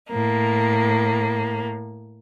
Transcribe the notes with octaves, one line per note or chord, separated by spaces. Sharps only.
A2 A#3